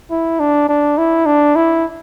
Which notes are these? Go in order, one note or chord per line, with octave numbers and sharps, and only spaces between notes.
E4
D4
D4
E4
D4
E4